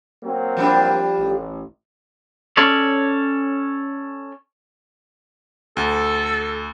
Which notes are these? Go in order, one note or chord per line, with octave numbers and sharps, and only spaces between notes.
F#3 A#3 C4
F3 G3 D4
A1
C#4 A4 C#5 D5
D2 A4